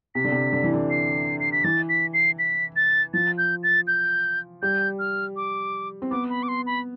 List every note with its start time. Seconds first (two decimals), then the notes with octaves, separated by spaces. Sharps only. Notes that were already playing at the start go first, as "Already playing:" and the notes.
0.15 C3 B6
0.24 D3
0.32 C3
0.53 D3
0.64 E3
0.74 D3
0.90 C7
1.40 C7
1.52 B6
1.64 E3 A6
1.89 B6
2.14 C7
2.39 B6
2.76 A6
3.14 F3 A6
3.38 G6
3.63 A6
3.87 G6
4.62 G3 G6
4.99 F6
5.36 D6
6.02 C4
6.11 B3 D6
6.30 B5
6.43 D6
6.48 C6
6.66 B5